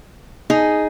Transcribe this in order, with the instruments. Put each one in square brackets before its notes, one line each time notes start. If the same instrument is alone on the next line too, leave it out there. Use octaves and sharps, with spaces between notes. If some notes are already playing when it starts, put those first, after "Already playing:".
[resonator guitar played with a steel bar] D#4 G#4